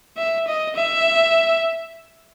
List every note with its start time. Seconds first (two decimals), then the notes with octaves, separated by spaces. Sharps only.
0.18 E5
0.48 D#5
0.76 E5